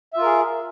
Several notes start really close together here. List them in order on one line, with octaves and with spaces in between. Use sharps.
E5 F4 A#4 G#4